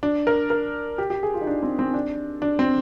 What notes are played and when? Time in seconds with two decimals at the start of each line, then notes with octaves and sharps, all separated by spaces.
0.03 D4
0.27 A#4
0.50 A#4
0.98 G4
1.10 G4
1.23 G#4
1.34 F4
1.41 D#4
1.47 D4
1.63 C4
1.79 C4
1.94 D4
2.42 D4
2.59 C4